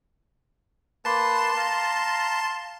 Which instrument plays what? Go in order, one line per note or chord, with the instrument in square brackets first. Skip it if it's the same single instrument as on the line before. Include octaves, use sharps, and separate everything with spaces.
[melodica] A#3 B4 [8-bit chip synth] A5 C6
[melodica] F5 A#5